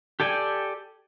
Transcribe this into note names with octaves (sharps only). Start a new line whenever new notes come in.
G4 A4 D5 G5 G#5